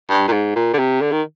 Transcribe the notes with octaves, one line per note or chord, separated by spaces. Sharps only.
G2
A#2
G#2
A#2
D3
C3
D3
D#3